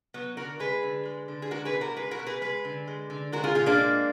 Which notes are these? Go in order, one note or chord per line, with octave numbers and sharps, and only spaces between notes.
F#3 B3
D3 F#4 A#4
G#3 G#4 B4
D3
G#3
D3
G#4
G#3 F#4 A#4
G#4 B4
B2
F#4 A#4
G#3 G#4 B4
F#4 A#4
B2
G#4 B4
G#3 G#4 B4
D3
G#3
D3
G#3 F#4 A#4
F4 G#4
A#2 F4 G#4
A#3 D4
G#3